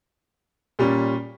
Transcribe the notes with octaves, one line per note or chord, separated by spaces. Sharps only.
A#2 G3 C#4